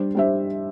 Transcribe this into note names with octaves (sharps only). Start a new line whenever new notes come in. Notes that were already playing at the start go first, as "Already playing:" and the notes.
Already playing: G3 D4 G4 C5
G3 D4 G4 C5 E5